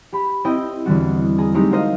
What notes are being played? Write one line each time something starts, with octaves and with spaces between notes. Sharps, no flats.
G4 B5
C4 E4 D#5 G5
E2 D3 G3 F#4
G#4 A#5
F#3 G#3 A3 C4 D#4 G4
F#4 A#4 C5 D#5 F5